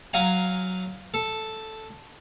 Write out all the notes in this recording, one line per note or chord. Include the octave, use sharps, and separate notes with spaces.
F#3 F5 G#5 A#5
A4